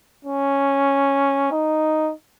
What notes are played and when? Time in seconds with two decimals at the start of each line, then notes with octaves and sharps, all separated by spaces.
0.25 C#4
1.52 D#4